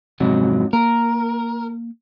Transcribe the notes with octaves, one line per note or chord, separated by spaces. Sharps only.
F2 G#2 C3 F#3
A#3 A#4